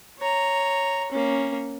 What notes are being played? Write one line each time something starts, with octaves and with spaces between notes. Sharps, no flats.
C#5 A#5
A#3 C#4